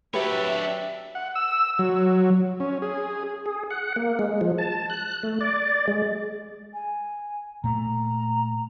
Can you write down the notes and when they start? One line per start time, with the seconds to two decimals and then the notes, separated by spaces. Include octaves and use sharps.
0.14 F#3 D4 G4 B4 C#5 E5
1.15 F#5
1.35 E6
1.79 F#3
2.60 C#4
2.82 G#4
3.46 G#4
3.71 F#5
3.96 A#3
4.19 G#3
4.41 F3
4.58 A5
4.90 F#6
5.23 A3
5.41 D5
5.88 G#3
6.74 G#5
7.64 A#2 A3 A#5